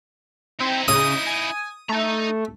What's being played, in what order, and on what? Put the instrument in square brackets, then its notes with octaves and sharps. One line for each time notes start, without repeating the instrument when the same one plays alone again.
[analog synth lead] C4 [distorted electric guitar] D#4 E4
[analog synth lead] C#3 [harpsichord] D#6
[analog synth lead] G#5
[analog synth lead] A3 [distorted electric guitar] D#4 A#5